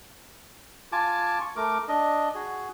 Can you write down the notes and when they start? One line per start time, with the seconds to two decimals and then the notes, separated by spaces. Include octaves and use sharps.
0.92 F4 G#5 A5 D6
1.41 C#6
1.56 A3 A#4 D6
1.88 D4 D#5
2.35 F#4 G#4